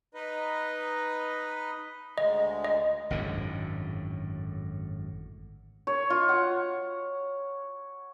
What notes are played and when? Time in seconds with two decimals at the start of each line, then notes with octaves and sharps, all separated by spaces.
0.14 D#4 B4 D#5
2.18 D2 G#3 D#5
2.64 D#5
3.10 G#1 F#2 A2 D3
5.87 C#5
6.10 F4
6.29 F#5